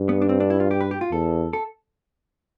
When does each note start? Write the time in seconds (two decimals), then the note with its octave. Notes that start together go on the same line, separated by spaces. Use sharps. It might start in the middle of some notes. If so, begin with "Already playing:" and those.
Already playing: G2
0.09 B3
0.22 D4
0.29 C4
0.40 D4
0.50 E4
0.60 F4
0.71 G4
0.81 B4
0.91 G4
1.01 F4
1.12 E2 A4
1.53 A4